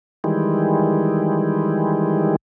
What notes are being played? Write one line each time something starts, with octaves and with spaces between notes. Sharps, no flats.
D#3 E3 G3 G#3